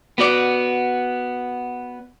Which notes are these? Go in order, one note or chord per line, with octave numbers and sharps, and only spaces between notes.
B3 F#4 D5